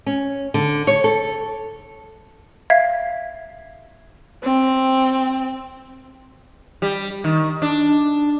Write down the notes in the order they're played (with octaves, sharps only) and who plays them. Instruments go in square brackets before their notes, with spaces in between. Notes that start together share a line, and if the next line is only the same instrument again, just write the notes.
[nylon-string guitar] C#4
D3
C#5
A4
[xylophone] E5 F5 G#6
[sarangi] C4
[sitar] G3
D#3
D4